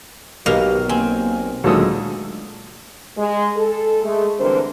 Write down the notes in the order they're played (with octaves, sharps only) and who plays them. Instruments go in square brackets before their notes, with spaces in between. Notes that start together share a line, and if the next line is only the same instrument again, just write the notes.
[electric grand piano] B1 F6 [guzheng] B2 A#3 F5 [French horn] G4
[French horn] A#3 [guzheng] C4 [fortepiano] G#5
[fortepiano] D2 A4 D#6 [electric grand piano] A#2 F#3 G#3 [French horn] D#3
[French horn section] G#3
A4
G#3 A3
D3 E3 G3 C4 A#4 C5